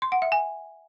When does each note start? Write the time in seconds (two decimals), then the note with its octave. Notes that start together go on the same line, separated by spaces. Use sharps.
0.02 C6
0.12 F#5
0.22 E5
0.32 G#5